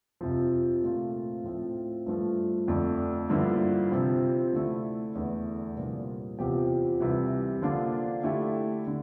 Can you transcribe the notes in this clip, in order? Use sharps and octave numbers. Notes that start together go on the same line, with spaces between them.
F2 C3 F3
A#2 A3 C4 F4
A2 F3 C4 F4
G2 F3 A3
F2 D3 A3 D4
G2 D3 F3 A#3 E4
C3 F3 C4
D3 A3 E4
E2 D3 A3
C2 A#2 F3
E2 C3 F3 C4 G4
C2 C3 E3
D3 F3 A#3 D4 F4
D3 A3 E4 G4
D3